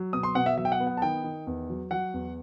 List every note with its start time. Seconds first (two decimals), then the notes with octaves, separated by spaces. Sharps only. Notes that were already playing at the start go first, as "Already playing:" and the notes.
Already playing: F#3
0.13 B2 D#6
0.23 C6
0.35 B2 F#5
0.46 E5
0.57 F#3 E5
0.65 G5
0.72 F#5
0.80 B3
0.87 F#5
0.97 A5
1.02 D#3 G5
1.24 D#3
1.47 E2
1.70 F#3
1.91 F#3 F#5
2.14 E2